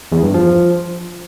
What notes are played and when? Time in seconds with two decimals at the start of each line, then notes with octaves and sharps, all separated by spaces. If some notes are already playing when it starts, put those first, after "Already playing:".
0.12 E2
0.23 G2
0.34 F3